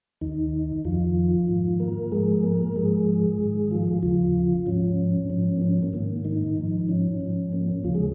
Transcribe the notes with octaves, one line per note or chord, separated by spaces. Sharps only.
D#2 D#3 D#4
F2 D#3 F3 F4
G#2 D#3
A#3 A#4
G#2 F3 G#3 G#4
A#3 A#4
G#2 F3 G#3 G#4
G#2 D#3
F3 F4
D#2 C#3 F3 F4
G#2 F3 C#4
G#2 F3 C#4
A#3
C#4
C#4
A#3
G#2 D#3 A#3
D#3 D#4
G#2 F3
C#4
G#2 F3
A#3
C#4
D#2 C#3 F3 F4
G#3 G#4